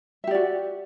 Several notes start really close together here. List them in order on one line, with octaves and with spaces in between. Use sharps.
E5 G4 D5 F#4